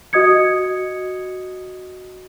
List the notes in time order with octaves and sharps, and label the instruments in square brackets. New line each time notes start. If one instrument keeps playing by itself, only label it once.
[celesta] F#4 D#5 D#6 G#6 C#7